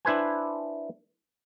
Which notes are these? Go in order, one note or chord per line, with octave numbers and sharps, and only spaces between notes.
D4 E4 B4 C5 G#5